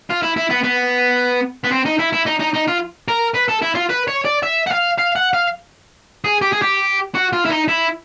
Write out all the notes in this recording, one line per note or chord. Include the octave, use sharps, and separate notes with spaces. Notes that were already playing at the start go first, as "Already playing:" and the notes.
F4
E4
E4
B3
B3
B3
C4
D#4
E4
E4
D#4
D#4
D#4
F4
A#4
B4
A4
E4
F4
B4
C#5
D5
E5
F#5
F5
F5
F#5
F5
G#4
G4
G#4
G4
F#4
F4
E4
D#4
E4